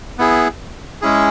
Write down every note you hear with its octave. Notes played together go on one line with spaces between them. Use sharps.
B3 E4 G#4
G#3 C#4 E4 G#4